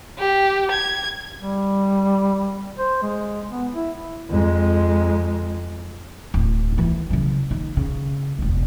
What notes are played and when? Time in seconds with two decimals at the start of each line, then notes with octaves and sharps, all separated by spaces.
0.18 G4
0.71 G#6
1.41 G3
2.77 C5
3.02 G#3
3.51 B3
3.72 E4
4.30 F2 G#3
6.34 D1
6.78 D#3 E3
7.10 C#3 F#3
7.51 D#3
7.77 C#3
8.38 E1 D2